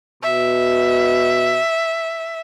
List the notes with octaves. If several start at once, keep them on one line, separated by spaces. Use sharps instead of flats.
B2 E5